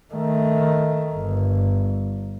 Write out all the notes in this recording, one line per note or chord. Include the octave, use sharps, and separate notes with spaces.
D#3 A3
G1